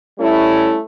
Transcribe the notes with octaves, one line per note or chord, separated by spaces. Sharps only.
G3 A3 C#4 E4